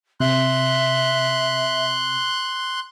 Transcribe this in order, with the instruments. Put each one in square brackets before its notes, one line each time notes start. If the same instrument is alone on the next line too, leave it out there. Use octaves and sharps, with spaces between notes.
[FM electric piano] C3 [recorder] E5 [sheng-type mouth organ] C6 F#6